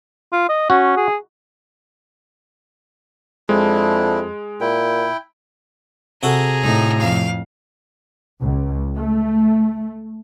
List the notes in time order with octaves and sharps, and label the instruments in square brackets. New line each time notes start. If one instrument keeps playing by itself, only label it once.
[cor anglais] F4
D#5
[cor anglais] C#4 [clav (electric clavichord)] F#4
[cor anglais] G#4
[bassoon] F2 [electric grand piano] G#3 [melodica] D4 E4
[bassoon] A#2 [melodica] E4 G5
[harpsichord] C3 F#4 A4 [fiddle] G#4 A#5
[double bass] A2 [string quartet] D#4
[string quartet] F2 F5
[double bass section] C#2
A3